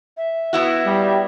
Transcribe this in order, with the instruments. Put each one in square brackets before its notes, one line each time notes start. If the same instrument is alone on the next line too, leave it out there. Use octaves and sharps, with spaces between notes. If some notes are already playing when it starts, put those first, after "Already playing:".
[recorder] E5
[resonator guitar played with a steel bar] B3 E4 F#4
[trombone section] G3